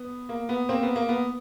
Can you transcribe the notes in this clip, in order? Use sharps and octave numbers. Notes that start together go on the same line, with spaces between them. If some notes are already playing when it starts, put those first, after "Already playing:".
Already playing: B3
A#3
B3
A#3 C4
B3
A#3
B3